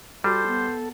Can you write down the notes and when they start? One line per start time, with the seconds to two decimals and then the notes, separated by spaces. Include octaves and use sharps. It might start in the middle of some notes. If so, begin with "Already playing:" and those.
0.24 G3 F#4 A4 C5
0.47 B3